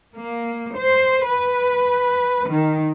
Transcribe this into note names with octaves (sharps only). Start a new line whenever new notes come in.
A#3
C5
B4
D#3